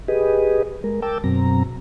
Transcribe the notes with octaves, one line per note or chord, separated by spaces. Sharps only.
G4 G#4 B4 D#5
G#3 A#4
A#4 G5 A5 D6 E6
F#2 B2 F#3 C4 A#5